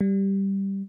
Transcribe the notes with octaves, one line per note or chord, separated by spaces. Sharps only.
G3